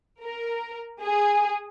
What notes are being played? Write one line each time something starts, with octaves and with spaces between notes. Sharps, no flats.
A#4
G#4